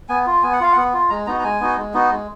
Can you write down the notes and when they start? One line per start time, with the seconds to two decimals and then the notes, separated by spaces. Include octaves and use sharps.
0.09 B3 G#5
0.26 F4
0.43 B3 G#5
0.53 F#5
0.60 F4 F5
0.72 B3 F#5
0.93 F4
1.10 G#3 A#5
1.27 B3 D#4 F#4 A#5
1.40 A#5
1.44 G#3 G#5
1.60 B3 D#4 F#4
1.77 G#3
1.94 B3 D#4 F#4
2.11 G#3